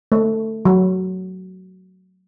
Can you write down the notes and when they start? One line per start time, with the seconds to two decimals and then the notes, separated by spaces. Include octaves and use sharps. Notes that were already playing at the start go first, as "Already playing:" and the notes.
0.12 A3
0.65 F#3